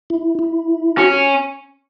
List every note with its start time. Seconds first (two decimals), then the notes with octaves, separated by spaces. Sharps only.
0.10 E4
0.39 E4
0.98 C#4 F#4